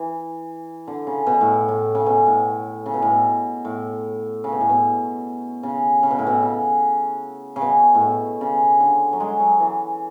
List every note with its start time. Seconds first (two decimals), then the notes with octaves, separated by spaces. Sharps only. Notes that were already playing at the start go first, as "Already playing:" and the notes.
Already playing: E3
0.88 D3
1.07 C#3
1.27 B2
1.41 A2
1.68 A2
1.95 C#3
2.06 B2
2.26 A2
2.86 C#3
2.94 B2
3.02 A2
3.11 B2
3.65 A2
4.44 C#3
4.52 B2
4.61 A2
4.69 B2
5.63 C#3
6.03 C#3
6.11 B2
6.19 A2
6.27 B2
6.42 C#3
7.56 C#3
7.62 B2
7.95 A2
8.01 B2
8.41 C#3
8.80 D3
9.13 F#3
9.20 G#3
9.40 F#3
9.60 E3